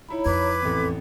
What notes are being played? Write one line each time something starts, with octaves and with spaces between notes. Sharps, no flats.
D#4 E4 C#5 A#5 B5
F2 B4 D6 G#6
A1 E2 C4 A4